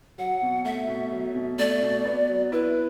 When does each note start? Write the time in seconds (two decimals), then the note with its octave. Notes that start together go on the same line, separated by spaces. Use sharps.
0.18 F#3 F#5
0.42 B2
0.65 A3 E5
0.88 B2
1.12 F#3
1.35 B2
1.59 A3 D5
1.82 B2
2.05 B3
2.29 F#3
2.52 E4 B4